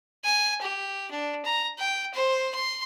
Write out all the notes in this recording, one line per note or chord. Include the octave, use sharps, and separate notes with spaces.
G#5
G4
D4
A#5
G5
C5
C6